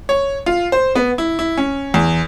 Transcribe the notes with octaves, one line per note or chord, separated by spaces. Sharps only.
C#5
F4
C5
B3
E4
E4
C#4
E2